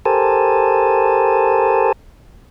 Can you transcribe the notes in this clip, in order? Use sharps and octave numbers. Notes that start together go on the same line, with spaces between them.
G4 A4 A#4 C5 G#5 A5